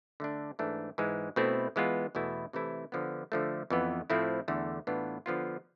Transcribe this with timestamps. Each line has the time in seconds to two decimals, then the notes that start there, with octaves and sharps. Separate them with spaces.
0.20 D3 A3 D4
0.59 G#2 E3 A3 D4
0.98 G#2 E3 G#3
1.36 B2 A3 C4 E4
1.76 E3 G#3 B3 F4
2.15 E2 B2 A3 E4
2.53 C3 E3 A3 E4
2.92 D3 F3 B3
3.32 D3 F3 A3
3.70 F2 E3 B3
4.10 A2 F3 A3 C4 E4
4.48 E2 D3 A3
4.87 A2 E3 B3 D4 F4
5.26 D3 F3 B3 F4